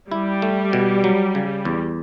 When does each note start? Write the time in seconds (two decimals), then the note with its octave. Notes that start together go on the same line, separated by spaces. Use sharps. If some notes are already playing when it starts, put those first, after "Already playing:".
0.12 G3 E4
0.42 A3
0.73 B2
1.04 F#3
1.35 C#3
1.65 E2